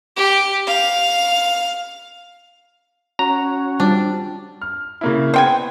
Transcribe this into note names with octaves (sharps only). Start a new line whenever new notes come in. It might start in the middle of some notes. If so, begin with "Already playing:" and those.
G4
F5
C#4 F#4 A#5
G3 C4 D4 F4
F6
C#3 A#3 E4
B3 C5 G5 G#5